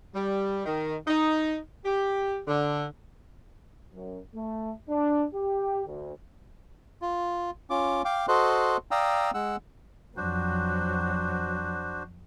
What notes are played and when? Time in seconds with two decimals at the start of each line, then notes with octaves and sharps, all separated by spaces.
0.15 G3
0.66 D#3
1.07 D#4
1.85 G4
2.48 D3
3.94 F#2
4.35 A3
4.90 D4
5.34 G4
5.87 D2
7.02 F4
7.70 C#4 F4 D6
8.05 F5 G5 D6
8.28 F#4 A4 C5 D#5 C6 F#6
8.91 D5 F5 G5 A#5 D#6 E6
9.34 G#3 F#5 E6
10.17 F2 F#3 D4 F#4 C5